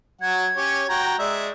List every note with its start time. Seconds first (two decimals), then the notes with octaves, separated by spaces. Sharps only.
0.22 F#3 F#5 G#6
0.56 C#4 G4 C#5
0.89 F#4 G5 A#5
1.19 G#3 D5 E5